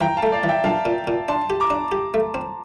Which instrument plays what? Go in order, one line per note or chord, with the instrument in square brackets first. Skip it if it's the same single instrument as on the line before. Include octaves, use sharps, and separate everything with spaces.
[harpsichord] E3 [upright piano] G5 A#5
[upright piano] F5 A5
[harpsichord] A3
[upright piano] D5 F5
[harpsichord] E3
[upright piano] E5 G5
[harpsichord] A#1 [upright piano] F5 A5
[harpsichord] A#2
A#2
[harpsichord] D4 [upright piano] A5 C6
[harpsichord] G4
[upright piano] A#5 D6
[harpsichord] D4
G4
A3
C4